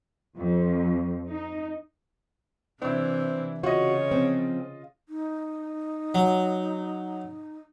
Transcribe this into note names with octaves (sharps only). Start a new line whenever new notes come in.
F2
D#4
C3 E3 C4 D4 E4
C#3 F4 F#4 C#5 D#5
F3 C4
D#4
F#3